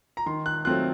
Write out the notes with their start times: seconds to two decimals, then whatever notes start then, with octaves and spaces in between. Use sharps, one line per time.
0.17 A#5
0.26 D#3 C6
0.46 F#6
0.65 F#3 A3 C4 F4 F#6